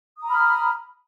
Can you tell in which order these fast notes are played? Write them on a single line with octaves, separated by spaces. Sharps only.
D#6 A#5 B5 F6